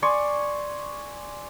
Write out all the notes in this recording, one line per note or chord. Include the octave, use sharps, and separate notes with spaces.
D5 G#5 C6 C#6